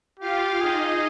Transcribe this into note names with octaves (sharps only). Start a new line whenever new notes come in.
F4 G4 F5
D#4 G#4 D#5